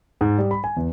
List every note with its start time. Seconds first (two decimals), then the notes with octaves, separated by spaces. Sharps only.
0.21 G#2
0.38 G3
0.51 B5
0.64 G#5
0.76 E2